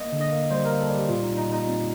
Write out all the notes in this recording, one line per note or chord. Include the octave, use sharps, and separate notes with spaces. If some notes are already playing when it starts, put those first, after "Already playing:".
Already playing: A#3 D#5
D3
D#5
A#3
G3 C5
A#3 A#4
A4
G3
G4
A#2 F4
D#4
A#2
D#4
A#2 D#4
A#2 C4